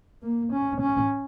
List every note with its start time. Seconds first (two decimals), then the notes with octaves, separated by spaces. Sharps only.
0.23 A#3
0.52 C#4
0.81 C#4